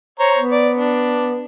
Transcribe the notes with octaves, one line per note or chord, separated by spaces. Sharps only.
C5 C#5 A#5
B3
D5
D4